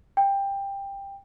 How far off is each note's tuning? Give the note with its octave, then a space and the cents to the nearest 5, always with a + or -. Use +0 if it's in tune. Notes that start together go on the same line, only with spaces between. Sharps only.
G5 +15